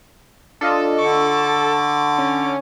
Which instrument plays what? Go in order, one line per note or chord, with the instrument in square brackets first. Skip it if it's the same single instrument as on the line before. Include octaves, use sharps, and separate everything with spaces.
[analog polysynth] D4 F4 D#5 [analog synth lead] A4
[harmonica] D3 D6 [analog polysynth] C#6
[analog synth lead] C#4